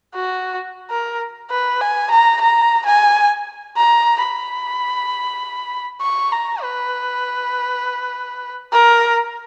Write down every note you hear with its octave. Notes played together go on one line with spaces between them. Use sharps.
F#4
A#4
B4
G#5
A#5
A#5
G#5
A#5
B5
C#6
A#5
B4
A#4